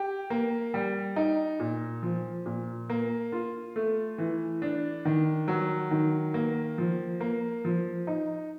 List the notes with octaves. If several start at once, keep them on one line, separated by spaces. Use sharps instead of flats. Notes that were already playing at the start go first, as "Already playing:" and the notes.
Already playing: G4
A#3
G3
D#4
A#2
F3
A#2
A#3
F4
A3
E3
D4
D#3
F#3
D#3
A#3
F3
A#3
F3
D#4